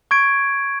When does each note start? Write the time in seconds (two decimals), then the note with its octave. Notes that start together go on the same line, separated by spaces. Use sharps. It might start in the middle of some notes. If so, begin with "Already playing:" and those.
0.11 C#6 G#6 D7